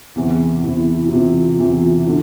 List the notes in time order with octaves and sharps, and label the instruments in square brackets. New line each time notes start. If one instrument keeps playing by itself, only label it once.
[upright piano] E2 C3 E3 [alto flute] E4
[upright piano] E2 C3 E3
[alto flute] F#4
[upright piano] E2 C3 E3 [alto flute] F4
[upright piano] E2 C3 E3
[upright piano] D3 [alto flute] E4